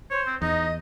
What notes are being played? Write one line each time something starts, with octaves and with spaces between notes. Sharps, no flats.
C5 C#5
C4
E2 D#4 D#5